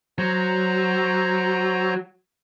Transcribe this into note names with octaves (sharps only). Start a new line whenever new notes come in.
F#3 C5 A#5